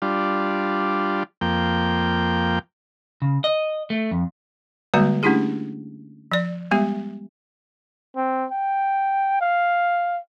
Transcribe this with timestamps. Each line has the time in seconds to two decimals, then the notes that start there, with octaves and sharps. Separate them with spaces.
0.02 G3 D4 F4
1.41 F2 A#3 G5
3.22 C#3
3.44 D#5
3.90 A3
4.11 F2
4.94 D3 G3 G#3 A#3 F#4 D5
5.23 A3 C#4 D4 E4 G4 G#4
6.32 F3 D5
6.71 G3 G#3 B3 G4 E5
8.16 C4
8.52 G5
9.41 F5